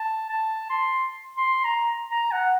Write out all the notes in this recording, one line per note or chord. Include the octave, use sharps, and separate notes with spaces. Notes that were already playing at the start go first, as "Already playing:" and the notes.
Already playing: A5
A5
C6
C6
A#5
A#5
F#5